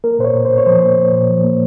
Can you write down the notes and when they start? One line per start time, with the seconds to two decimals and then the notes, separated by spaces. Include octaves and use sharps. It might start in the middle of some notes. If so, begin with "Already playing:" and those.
0.04 A#3 A#4
0.19 A#2 C5
0.24 C#5
0.34 A#2
0.45 C5
0.51 A#2
0.58 C#5
0.66 F3 C5
0.82 A#3
0.98 A#2
1.13 A#2
1.29 F3
1.44 A#3